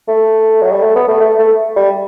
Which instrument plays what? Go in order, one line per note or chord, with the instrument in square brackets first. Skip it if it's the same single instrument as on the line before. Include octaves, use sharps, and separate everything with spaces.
[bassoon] A3
F#3
G3
A3
B3
A3
A3
A3
G3